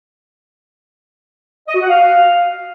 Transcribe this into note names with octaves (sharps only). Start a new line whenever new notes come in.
D#5
F#4
F#5
F5